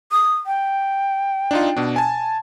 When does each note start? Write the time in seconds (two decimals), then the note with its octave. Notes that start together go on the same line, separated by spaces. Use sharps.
0.12 D#6
0.46 G5
1.51 D4 D#4 F4
1.77 B2 D4
1.96 G#5 A5